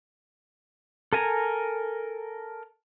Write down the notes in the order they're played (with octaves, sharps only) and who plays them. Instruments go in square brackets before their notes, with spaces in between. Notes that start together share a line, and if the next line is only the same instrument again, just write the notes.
[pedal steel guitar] A4 A#4 G#5 A#5